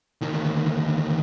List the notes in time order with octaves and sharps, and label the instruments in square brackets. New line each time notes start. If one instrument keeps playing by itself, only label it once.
[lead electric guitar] D2 D#3